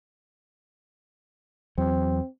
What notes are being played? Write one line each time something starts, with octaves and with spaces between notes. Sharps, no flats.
E2 F#3 C4